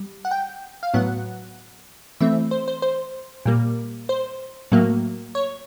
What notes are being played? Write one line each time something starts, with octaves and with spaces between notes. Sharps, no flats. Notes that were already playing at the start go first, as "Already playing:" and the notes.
Already playing: G3
F#5
G5
F5
A2 F#3 B3 F#5
E3 A3 C4 E5
C5
C5
C5
A#2 G3 A#3
C5
A2 F#3 A#3
C#5